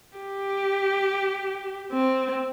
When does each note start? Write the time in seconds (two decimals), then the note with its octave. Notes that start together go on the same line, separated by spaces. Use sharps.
0.17 G4
1.92 C4